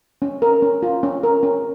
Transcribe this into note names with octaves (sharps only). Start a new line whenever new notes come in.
C#4
A#4
C#4
F4
C#4
A#4
C#4